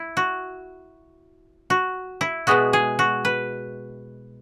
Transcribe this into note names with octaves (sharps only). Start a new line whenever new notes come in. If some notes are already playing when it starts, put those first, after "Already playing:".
Already playing: E4
F#4
F#4
E4
B2 G#3 B3 F#4
G#4
F#4
B4